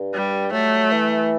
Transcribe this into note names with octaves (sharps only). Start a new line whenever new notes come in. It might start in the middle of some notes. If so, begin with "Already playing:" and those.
Already playing: G2
G3
F#3 A3
E3